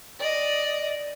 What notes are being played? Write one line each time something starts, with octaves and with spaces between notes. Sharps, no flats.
D5 D#5